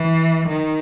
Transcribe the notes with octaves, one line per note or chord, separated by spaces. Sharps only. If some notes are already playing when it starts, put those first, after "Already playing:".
Already playing: E3
D#3